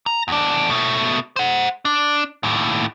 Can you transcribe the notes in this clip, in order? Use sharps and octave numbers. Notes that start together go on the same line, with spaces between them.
A#5
E2 D4
B2 A3
C5 F#5
D4
D#2 A2